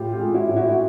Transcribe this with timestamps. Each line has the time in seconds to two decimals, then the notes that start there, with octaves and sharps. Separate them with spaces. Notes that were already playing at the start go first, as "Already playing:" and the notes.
Already playing: A2 F4 G4
0.13 F4 G4
0.19 G#3
0.34 E4 F#4
0.49 A2
0.56 E4 F#4
0.73 F#4